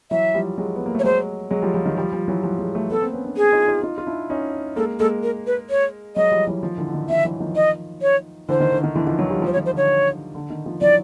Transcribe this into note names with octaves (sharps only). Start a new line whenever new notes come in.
E3 F#3 E5
F3 G3
F#3 G#3
B3
A#3
A3 C#5
F#3 G#3 C5
F#3 G#3
F3 G3
F3 G3
D#3
F3 G3
F3 G3
E3 F#3
F3 G3
F#3 G#3
G3 A3
A3 B3 A4
A#3 C4
B3 C#4
C4 D4
G#4
D#4 F4
D#4 F4
D#4 F4
F4
D4 E4
C#4 D#4
G#3 A#3 A4
G#3 A#3 A4
A#4
B4
C#5
F#3 G#3 D#5
F3 G3
E3 F#3
D#3 F3
D3 E3
D3
D#3
D#3 F3 E5
E3 F#3
D#3 F3
D#5
C#5
D3 E3 C5
D#3
D3
D#3
D3 E3
D#3 F3
E3 F#3
F3 G3
F3 G3 C5
C#5
D#3 F3
C5
D3 C#5
D3
D#3
D#3 F3
E3 F#3 D5